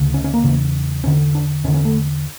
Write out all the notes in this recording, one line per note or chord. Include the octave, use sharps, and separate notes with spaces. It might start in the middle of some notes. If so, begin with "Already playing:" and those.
Already playing: D2 C#3
C#4
C#4
A#3
E2 C#3
E2 D3 C#4
D4
E2 D3 C#4
C#4
A3